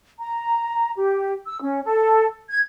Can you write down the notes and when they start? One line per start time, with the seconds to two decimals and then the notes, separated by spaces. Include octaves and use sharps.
0.19 A#5
0.96 G4
1.46 E6
1.61 C#4
1.84 A4
2.49 G#6